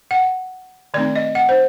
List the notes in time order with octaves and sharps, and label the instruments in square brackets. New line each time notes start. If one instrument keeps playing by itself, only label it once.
[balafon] F#5
D#3 A3 C4 D#4 D5
D#5
F#5
C5